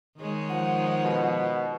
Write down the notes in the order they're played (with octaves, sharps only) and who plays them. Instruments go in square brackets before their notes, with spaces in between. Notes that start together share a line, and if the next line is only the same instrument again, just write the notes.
[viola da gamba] D#3 G#3 C#5
[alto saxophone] F3 [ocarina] F#5
[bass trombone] B2